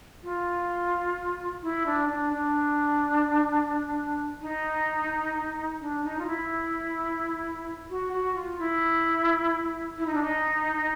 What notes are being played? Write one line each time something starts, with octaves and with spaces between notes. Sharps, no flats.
F4
E4
D4
D4
D4
D#4
D4
D#4
F4
E4
F#4
F#4
F4
E4
E4
D#4
D4
D#4